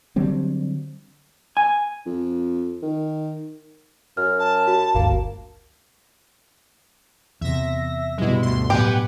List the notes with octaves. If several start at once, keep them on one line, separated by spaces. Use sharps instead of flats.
D3 F#3 G3 C4
G#5
F2
D#3
F#2 F6
A5
F#4
G1 D2 A#3
E2 C3 E5 A#6
G2 B2 G#3 E4
D2 C6
A2 F#3 B3 G4 B4 F#5 G#5